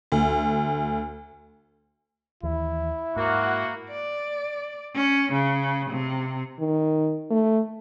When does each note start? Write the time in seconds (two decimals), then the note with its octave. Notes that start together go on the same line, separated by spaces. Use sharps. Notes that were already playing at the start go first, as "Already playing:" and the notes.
0.12 D2
2.43 D#2 E3 E4
3.16 G#2 A#3 F#4
3.91 D5
4.96 C#4
5.33 C#3
5.90 C3
6.60 D#3
7.31 A3